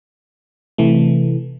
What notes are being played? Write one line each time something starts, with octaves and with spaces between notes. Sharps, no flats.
C3 E3 A3